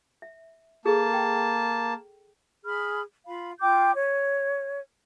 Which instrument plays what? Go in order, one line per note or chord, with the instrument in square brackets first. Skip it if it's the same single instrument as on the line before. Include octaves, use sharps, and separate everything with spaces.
[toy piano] E5
[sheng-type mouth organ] A#3 A5 [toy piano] G#4 A4
[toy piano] G5
[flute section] G#4 B5 F6
F4 F5 B5
F4 G5 D6 G6
C#5